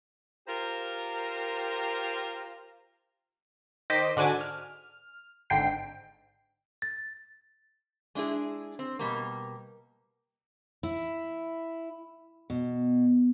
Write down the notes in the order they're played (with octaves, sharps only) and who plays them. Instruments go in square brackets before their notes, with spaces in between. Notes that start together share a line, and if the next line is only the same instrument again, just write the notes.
[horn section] F4 G4 A#4 C5 A#5
[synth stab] D#3 C5 D#5 D6 B6
G#2 D3 D4 F#4 G#5 D6
F6
G#1 G#2 D3 G5 C7
[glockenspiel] A6
[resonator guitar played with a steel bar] G#3 D4 E4 G#4
C4
B2 G3 A#3
[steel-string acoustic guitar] E4
B2